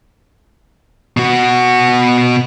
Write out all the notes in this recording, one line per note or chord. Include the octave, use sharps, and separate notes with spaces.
B2 F#4